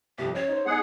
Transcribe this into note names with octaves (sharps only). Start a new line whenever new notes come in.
C2 F2 G4
C#4 C#5
D#4 C5
B3 D#4 G#4 F#5